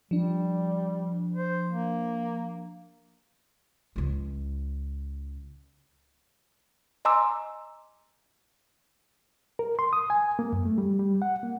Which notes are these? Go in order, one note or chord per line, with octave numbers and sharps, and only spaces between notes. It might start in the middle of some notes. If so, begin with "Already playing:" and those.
F3 G3 D4
C5
A#3
C#2 C#3
D#5 G#5 A#5 C6 D6 E6
A#4
C6
D#6
G#5
A#3
F#2
A3
G3
G3
F#5
A#3